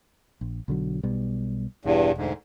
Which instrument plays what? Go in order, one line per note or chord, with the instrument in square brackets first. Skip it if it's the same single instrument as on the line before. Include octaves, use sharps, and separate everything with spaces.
[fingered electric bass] A#1
B1 D3 F#3
B1 B2 G3
[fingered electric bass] E1 [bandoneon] E2 G2
[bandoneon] D2 G#2